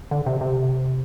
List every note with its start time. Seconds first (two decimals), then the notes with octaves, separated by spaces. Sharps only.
0.11 D3
0.26 C3
0.41 C3